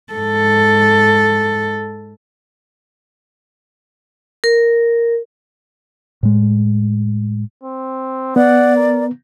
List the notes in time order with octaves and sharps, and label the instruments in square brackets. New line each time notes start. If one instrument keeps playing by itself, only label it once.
[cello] G#2 A4
[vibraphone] A#4
[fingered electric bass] A2 G#3
[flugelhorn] C4
[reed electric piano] B3 [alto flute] D5 [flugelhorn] F#5
[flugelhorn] A#4